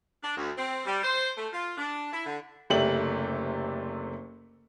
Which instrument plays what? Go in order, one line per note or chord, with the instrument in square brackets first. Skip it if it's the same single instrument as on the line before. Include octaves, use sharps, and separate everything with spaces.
[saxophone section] D4
D2
C4
G3
C5
A3
F4
D4
E4
D3
[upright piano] F#1 C3 A3 G4 D5 F#7